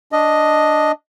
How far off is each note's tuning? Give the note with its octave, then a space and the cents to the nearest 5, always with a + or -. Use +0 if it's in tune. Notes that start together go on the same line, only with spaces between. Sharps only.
D4 +0 D#5 +0